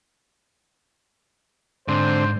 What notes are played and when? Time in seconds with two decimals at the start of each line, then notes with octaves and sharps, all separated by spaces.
1.88 G#2 D3 C4 C5